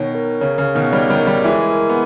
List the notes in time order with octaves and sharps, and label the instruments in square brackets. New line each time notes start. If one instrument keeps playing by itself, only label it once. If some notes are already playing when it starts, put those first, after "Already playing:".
Already playing: [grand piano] B2 D#3 [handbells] C#5
[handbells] A#4
[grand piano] C#3 [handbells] C#5
[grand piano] C#3
[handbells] C#5
[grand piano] B2 D#3
[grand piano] D#3 G3 [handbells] C#5
[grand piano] D#3 G3
[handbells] A#4
[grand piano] D#3 G3
[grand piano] E3 G#3 [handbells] E5
[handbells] A#4
[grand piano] B3